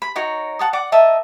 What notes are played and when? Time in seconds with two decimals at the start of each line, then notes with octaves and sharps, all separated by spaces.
0.02 B5
0.16 D#4 F#4 A#4 C#5
0.59 F#5 A5 D#6
0.73 D5 F#5 D6
0.92 A#4 D#5 E5 A5